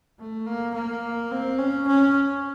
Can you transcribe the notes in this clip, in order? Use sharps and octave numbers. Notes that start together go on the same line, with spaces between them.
A3
A#3
A#3
C4
C#4
C#4